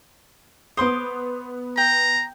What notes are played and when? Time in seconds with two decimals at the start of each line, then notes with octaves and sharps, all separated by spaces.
0.77 B3 C5 C6 D6 D#6
1.77 G5 A#5